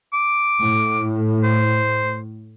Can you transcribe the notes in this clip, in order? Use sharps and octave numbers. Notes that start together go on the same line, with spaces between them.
D6
A2
C5